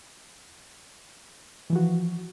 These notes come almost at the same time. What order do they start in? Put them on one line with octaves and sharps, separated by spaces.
E3 F3 F#4